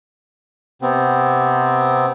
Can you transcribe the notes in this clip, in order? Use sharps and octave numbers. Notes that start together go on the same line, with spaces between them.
C3 B3 C4